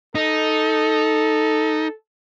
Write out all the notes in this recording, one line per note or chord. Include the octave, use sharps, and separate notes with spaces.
D#4 A4